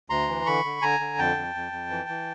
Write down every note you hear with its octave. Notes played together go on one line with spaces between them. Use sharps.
D2 A#5 C6
E3
D3 B5 C#6
D3
D3 G#5 A#5
D3
F2 G5 A5
F2
F2
F2
E3
E3